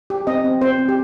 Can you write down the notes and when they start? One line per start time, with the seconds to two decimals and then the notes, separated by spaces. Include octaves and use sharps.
0.10 G4
0.27 C4 D#5
0.44 C4
0.61 C4 C5
0.78 C4
0.89 G4